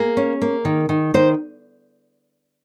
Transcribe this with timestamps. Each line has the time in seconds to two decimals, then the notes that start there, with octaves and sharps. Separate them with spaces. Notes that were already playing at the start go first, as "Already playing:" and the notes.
Already playing: A#3 G#4
0.17 C#4
0.42 A#3
0.65 D#3
0.89 D#3
1.14 D#3 C5